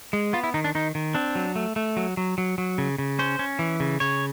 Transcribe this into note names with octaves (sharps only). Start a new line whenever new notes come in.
G#3
B3 F4
E4
D#3 D#4
D4
D#3 D#4
D#3
C4 D4
F#3
A3
A3
F#3
F#3
F#3
F#3
C#3
C#3
C#4 C5
C#4
E3
C#3
C#3 C#5